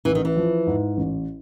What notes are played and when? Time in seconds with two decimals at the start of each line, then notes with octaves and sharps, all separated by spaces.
0.05 A1 E3
0.15 D#3
0.25 E3
0.37 F3
0.67 G#2
0.97 A1